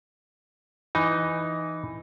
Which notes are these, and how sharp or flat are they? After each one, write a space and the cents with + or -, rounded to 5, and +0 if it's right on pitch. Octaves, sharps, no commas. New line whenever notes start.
E3 +0 D#4 +0